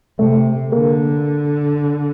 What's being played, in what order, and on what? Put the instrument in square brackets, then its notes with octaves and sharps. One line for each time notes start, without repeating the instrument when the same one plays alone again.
[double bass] C3 [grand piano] A3
[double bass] D3 [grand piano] A#3